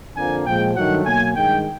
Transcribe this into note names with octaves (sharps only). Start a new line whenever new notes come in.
F2 D3 F3 A#3 G#5
A#2 F3 G#3 G5
G2 D#3 F#3 A3 F#5
B2 F#3 A#3 G#5
G2 D#3 G#3 G5